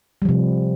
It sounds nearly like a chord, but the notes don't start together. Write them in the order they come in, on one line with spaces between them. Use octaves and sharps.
G3 F3 C3